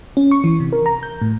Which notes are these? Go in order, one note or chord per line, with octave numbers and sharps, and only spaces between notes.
C#4
C#6
E3
C3
A#4
A#5
G6
A2